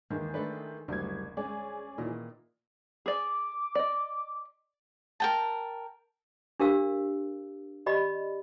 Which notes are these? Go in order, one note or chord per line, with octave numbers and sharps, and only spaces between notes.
D#2 D#3 E3 G#3
A3 D4 A4 B4 D#5
F#1 D2 G3 G#6
G#3 C#4 G#4 D5
A#2 D#3 E3 D#5
G#4 D5 D6
D5 D#5
A#4 G5 A5
D4 G4 A#4 F5 E6
G4 D5 D#5 B5